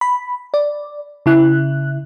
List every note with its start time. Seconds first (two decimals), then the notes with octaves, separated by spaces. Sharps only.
0.01 B5
0.54 D5
1.26 C#3 E4 F#6